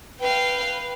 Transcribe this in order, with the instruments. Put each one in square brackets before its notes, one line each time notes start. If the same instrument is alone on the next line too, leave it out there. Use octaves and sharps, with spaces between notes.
[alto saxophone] B4 [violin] F5 G5